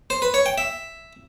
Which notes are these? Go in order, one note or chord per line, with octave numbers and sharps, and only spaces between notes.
C5
B4
C#5
G5
E5